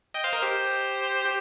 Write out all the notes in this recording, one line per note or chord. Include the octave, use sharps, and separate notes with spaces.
D#5 G5
C5 F5
A#4 D#5
G4 C5
G4